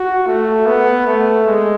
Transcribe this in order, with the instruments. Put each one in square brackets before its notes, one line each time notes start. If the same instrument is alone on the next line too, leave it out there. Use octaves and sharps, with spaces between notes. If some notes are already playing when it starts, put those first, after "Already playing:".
Already playing: [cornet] F#4
A3
B3
A3
G#3